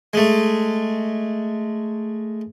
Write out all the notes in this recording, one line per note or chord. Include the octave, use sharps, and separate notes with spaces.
G#3 A3